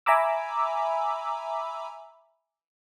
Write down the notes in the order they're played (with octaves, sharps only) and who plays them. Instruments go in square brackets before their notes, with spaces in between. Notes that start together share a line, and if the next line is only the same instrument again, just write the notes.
[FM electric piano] E5 G#5 A#5 B5 D6 E6